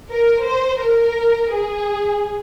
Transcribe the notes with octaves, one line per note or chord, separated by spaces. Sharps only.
A#4
C5
A#4
G#4